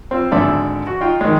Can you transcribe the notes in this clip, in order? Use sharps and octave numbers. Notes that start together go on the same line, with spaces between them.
C4 F4 E6
G#1 D3 D5 E5 A5 C6
F#4
D#4 F4 G5
D#3 G#3